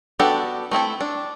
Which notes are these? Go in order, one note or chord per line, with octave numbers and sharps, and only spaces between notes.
B3 D4 F#4 G4 A4
A3 C4 E4 A4
D4